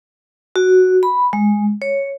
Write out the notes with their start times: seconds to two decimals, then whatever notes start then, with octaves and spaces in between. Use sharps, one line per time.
0.56 F#4
1.03 B5
1.33 G#3
1.82 C#5